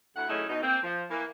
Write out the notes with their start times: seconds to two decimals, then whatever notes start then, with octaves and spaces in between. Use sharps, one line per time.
0.16 D2 E4 F#5
0.29 F#3 A3 C#4 D#4 E4 G#4
0.49 B2 D#4
0.63 A#3 C4
0.84 F3
1.10 E3 A#3